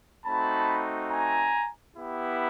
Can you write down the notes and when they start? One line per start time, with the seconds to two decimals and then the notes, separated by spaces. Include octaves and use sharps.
0.25 A3 C4 D#4 F#4 A5 B5
1.10 G#5 A#5
1.95 B3 E4 G4